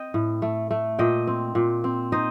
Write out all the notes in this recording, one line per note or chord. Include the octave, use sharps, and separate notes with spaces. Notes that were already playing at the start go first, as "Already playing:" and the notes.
Already playing: C4 D#5 G5
A2
A3
A3
A#2 D#5 G5
C4
A#2
C4
D#4 C5 D#5